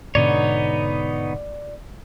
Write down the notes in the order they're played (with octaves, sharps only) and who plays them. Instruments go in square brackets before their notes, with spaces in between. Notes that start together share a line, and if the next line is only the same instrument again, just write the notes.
[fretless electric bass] G#2 B2 D3 [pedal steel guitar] B3 D#4 C#5 [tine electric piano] D5